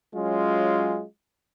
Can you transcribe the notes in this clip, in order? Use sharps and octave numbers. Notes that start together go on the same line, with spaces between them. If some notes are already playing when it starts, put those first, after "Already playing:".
F#3 G#3 C#4 F4